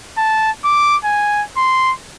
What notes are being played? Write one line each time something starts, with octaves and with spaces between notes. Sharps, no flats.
A5
D6
G#5
C6